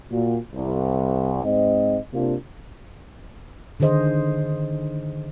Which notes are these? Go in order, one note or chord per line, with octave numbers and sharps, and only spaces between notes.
A#2 F#4
C2
G#2 C4 D#5
C3 A#3 D4 F4
D3 D#3 G#4 C5 D#5